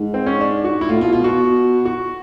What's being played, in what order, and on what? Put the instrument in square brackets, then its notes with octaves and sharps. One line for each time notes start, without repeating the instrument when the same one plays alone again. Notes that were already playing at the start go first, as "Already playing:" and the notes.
Already playing: [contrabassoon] G#2
[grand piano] C4
C#4
D4
F#4
E4
[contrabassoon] A2 [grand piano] F4
[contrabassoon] B2 [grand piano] F4
[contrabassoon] B2 [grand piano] F4
[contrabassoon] B2 [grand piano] F#4
[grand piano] F#4